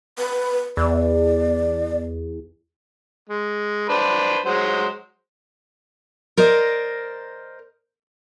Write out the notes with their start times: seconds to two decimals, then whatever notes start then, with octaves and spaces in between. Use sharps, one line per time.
0.18 B4
0.77 E2 D5
3.29 G#3
3.89 D4 B4 C5
4.45 F#3 G#3 C5
6.37 A#4 C5 D5 D#5